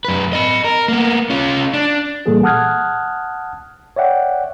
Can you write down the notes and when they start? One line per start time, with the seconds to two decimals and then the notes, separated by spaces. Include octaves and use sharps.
0.05 F#2 B4
0.33 D#5 B5
0.64 A#4
0.88 A#3 B3
1.30 C#4 F4
1.74 D4
2.26 A#2 E3 G3 A#3 G#4 A4
2.43 F#5 A5 D#6 F6 F#6 G#6
3.96 C#5 D5 E5 F#5 G5